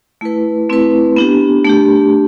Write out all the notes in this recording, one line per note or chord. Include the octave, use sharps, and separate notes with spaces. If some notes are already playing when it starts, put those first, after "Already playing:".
A3 E4 B4
A3 C4 E4 B4
B3 D4 G4
A3 D4 G4